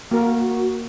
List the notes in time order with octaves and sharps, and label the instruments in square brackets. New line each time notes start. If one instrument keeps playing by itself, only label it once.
[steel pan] A#3 A#4 [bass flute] F#4